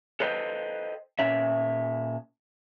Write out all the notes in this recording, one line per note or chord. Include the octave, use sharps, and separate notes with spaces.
A4 B4 C5 D#5 G5
A#2 C#4 E5